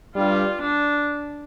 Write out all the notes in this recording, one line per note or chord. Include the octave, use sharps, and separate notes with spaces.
G2 G3 F4
D4